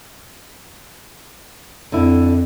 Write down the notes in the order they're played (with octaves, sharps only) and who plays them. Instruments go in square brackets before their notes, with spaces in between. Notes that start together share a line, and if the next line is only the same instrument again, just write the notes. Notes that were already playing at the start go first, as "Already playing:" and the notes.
[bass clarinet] F2 [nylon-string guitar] D3 E4